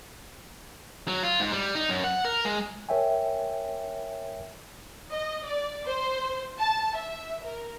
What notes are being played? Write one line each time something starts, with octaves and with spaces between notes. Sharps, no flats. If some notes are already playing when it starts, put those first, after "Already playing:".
F#3
F4
G#2
G3
D#4
F#2
F#5
A#4
G#3
A#4 C#5 E5 G5 G#5
D#5
D5
C5
A5
E5
A#4